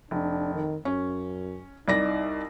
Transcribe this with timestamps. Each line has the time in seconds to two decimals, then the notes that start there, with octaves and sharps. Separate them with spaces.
0.11 F1 D4
0.54 D#3
0.85 F#2 C#4
1.88 C2 D#4 D5 A#6